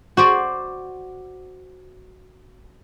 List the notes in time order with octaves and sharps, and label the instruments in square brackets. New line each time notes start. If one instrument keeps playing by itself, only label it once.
[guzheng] F#4 C5 D5